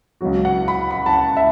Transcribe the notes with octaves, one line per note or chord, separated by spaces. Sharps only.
C#2 C#3 F#3 F#4
F#5
B5
B5
A5
F#5
E5